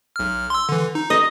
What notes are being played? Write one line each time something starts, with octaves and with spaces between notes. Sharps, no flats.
B1 F6
C6 E6
D3 E3
D#4
D#5